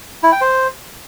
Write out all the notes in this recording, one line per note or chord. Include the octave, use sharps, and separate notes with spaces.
E4
G5
C5